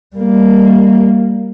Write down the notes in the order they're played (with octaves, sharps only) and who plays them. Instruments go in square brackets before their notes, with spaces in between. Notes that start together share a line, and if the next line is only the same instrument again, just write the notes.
[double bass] G3 A#3